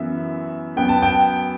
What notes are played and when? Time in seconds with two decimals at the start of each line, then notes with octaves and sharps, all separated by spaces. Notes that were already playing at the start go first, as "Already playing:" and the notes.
Already playing: F#2 E3 B3 E5
0.76 F#2 F#3 B3 G5
0.89 A5
1.02 G5